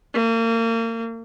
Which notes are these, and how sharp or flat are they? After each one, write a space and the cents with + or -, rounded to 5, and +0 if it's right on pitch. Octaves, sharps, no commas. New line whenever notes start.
A#3 -35